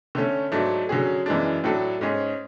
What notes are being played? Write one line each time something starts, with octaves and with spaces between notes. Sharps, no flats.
D3 A3 C#4
G#2 F#3 A3 D4
D3 F#3 C#4 G#4
F#2 E3 G#3 D4
A2 F#3 A3 D4 A4
G#2 G#3 C#4 G#4